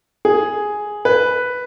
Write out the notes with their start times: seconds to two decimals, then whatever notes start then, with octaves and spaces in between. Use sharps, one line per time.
0.25 G#4
1.05 B4